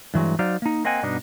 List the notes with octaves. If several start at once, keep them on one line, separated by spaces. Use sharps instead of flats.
G2 E3 F#3 G#3
F#3 D#4 C5 D5 F5
A#3 D#4
A#3 C4 D#5 F#5 G#5
G2 B2 B3 D4 D#4